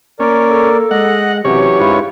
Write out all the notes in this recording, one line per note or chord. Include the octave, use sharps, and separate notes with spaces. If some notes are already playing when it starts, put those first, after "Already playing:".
A#3 C#4 A#4 D5
A4
G#3 D#5 F#5
C3 E3 F#3 C#4 G4 C#5
G#2 E4 F4 B4